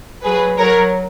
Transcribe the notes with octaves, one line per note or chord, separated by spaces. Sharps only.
F#3 G#4 B4
F#3 A#4 C#5